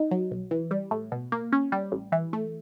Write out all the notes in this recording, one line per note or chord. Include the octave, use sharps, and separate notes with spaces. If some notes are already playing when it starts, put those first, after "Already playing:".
Already playing: D#4
F#3
B1
E3
G3
A2
B2
A#3
C#4
G3
A1
E3
A3